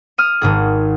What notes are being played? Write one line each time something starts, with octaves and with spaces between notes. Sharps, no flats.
D#6 F6 D#7
G#1 G#2 G#4